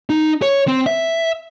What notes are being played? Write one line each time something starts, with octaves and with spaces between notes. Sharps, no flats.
D#4
C#5
C4
E5